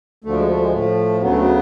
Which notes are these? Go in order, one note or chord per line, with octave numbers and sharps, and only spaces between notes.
D2 D3 F3 A3
G#3
A3
G#3
A2 F3 A3
D2 C#3 F#3 B3
A3
B3